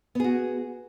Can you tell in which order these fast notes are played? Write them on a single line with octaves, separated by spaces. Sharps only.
B3 G#4 F#4